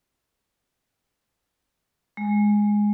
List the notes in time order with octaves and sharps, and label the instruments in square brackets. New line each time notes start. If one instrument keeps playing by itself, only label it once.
[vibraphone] G#3